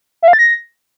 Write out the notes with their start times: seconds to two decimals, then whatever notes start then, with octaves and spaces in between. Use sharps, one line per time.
0.22 E5
0.28 F5
0.33 A6
0.39 A#6